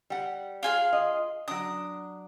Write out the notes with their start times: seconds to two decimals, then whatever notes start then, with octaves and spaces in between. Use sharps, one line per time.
0.10 G3 F#5
0.63 F4 G#4 F5
0.93 D#5
1.48 F#3 D4 D#6